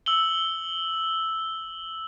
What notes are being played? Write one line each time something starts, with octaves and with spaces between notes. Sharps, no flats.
E6 F#7 G7